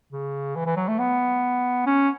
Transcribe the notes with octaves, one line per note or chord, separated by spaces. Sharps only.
C#3
E3
E3
F#3
A3
B3
C#4